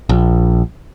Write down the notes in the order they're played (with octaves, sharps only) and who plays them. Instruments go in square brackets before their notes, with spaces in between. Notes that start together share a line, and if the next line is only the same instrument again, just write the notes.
[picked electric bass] A#1